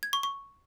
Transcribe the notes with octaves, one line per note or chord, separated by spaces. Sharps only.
G#6
C#6
C#6